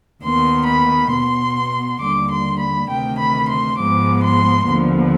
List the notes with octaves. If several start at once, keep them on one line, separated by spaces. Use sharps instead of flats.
D#2 D#3 B3 C6
B5
B2 B3 C6
D#2 D3 G3 D6
C6
B5
D2 C3 D#3 G5
B5
C6
G#2 F3 G#3 B3 D6
C6
D#2 D3 F3 B3